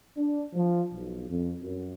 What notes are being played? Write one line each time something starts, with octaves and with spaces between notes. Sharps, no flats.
D4
F3
B1
F2
F#2